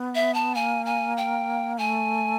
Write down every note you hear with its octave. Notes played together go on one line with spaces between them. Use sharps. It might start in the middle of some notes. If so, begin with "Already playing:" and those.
Already playing: B3
E5
A5
A#3 G#5
G#5
G5
A3 G#5